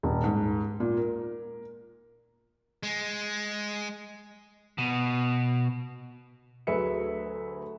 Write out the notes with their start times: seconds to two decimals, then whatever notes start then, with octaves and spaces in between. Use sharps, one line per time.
0.03 D#1
0.24 G#2
0.80 A#2
0.97 A#4
2.83 G#3
4.78 B2
6.67 D2 F#3 G#4 B4 E5 C#7